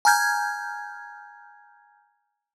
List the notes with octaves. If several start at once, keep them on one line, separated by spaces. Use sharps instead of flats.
G#5 A#5 F6 G6 G#6